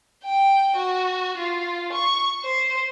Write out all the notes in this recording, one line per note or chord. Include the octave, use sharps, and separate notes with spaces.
G5
F#4
F4
C#6
C5